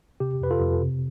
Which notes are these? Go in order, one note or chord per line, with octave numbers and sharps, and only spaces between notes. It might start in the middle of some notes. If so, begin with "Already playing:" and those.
C3 G4
F2 B4
F4 A4
F2
C3